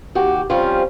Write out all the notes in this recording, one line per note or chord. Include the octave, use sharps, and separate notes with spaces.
D#2 F#4 G4
F3 G3 C4 C#4 F4